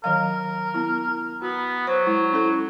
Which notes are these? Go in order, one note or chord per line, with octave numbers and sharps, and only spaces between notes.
D#3 F#3 A#4 F5
B3 E4
B3 F#4
F#3 C5
G#3 E4
C#4 E4 A4